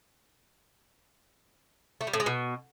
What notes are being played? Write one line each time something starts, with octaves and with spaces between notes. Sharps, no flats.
A3
G3
A2
G#3
B2